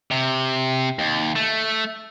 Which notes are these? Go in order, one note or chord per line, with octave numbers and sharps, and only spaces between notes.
C3
D#2
A3